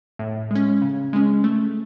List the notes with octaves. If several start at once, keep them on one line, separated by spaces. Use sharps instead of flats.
A2
G#3 C#4
C#3
G#3 C#4
A3